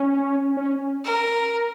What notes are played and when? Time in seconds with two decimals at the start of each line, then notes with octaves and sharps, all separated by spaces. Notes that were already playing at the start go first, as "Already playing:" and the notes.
Already playing: C#4
0.57 C#4
1.04 A#4